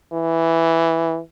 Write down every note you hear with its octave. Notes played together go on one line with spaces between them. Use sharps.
E3